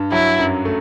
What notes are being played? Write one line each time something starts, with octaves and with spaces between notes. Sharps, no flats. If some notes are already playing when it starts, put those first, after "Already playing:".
Already playing: G2
F#3 E4
F#2
A3